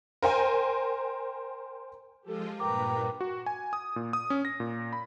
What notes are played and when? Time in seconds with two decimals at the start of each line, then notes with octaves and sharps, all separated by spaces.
0.23 A#4 C5 G5 G#5
2.25 F3 G#3 F4 G4 A4
2.60 G2 A#2 A#4 B4 G5 A#5 D6
3.21 F#4
3.46 G#5
3.73 D#6
3.96 A#2
4.13 D#6
4.30 C#4
4.45 A#6
4.60 A#2
4.93 B5